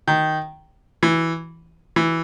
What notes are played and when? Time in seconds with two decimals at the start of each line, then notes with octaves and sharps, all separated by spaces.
0.07 D#3
1.03 E3
1.96 E3